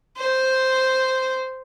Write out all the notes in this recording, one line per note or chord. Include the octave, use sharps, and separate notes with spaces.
C5